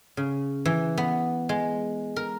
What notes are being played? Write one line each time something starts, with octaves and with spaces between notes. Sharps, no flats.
C#3
E3
B3
G#3
A#4